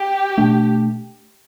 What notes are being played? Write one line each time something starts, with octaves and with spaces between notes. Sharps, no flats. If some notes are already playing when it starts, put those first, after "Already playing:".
Already playing: G4
B2 A3 D4